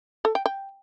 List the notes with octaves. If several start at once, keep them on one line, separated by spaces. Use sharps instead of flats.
A4
G5
G5